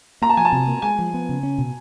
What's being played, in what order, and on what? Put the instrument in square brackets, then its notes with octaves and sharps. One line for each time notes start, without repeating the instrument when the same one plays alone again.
[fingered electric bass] A#3 [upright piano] A#5
[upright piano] A5
[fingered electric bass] F3 [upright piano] G#5
[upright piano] A5
[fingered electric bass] C3
A#3
[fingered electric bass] G#3 [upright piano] G#5
[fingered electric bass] F3
B3
C#3
C#4
B2